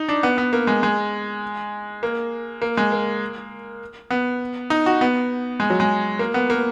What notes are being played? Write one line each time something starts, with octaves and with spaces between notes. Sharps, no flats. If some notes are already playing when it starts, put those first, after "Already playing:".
Already playing: D#4
D4
B3
B3
A#3
G#3
G#3
A#3
A#3
G#3
A#3
B3
D#4
F#4
B3
G#3
F#3
G#3
A#3
B3
A#3